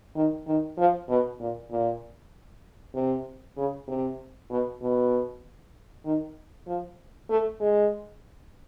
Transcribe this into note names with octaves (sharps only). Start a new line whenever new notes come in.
D#3
D#3
F3
B2
A#2
A#2
C3
C#3
C3
B2
B2
D#3
F3
A3
G#3